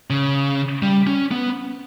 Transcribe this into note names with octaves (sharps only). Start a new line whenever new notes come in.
C#3
G3
C#4
B3